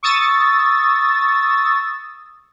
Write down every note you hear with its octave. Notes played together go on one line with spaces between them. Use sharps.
C#6 D#6 E6 A6